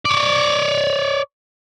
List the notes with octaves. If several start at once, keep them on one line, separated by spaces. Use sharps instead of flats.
C#5 D5